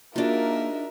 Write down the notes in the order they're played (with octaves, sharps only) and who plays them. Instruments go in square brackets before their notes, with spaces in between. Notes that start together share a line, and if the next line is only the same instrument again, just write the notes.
[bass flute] A#3 [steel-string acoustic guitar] D4 D#4 [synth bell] F4 F#4 G#4 [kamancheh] A#4 E5